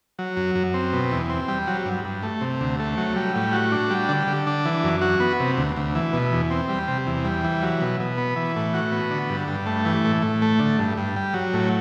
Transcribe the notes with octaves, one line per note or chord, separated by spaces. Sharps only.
F#3
F#2
F#2
C4
B2
E2
C4
G3
F#3
G2
G2
A3
C3
D2
A3
F#3
G3
A2
F#4
D4
G3
D3
D3
D4
E3
F#2
F#4
B3
C3
D2
D2
E3
B2
E2
C4
G3
C3
E2
G3
E3
F#3
B2
B2
B3
E3
A2
F#4
B3
D3
G2
G2
A3
E3
A2
A2
A3
D3
G2
G2
G3
F#3
A2